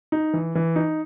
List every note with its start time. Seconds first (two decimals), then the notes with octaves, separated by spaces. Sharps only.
0.12 D#4
0.33 E3
0.55 E3
0.76 D#4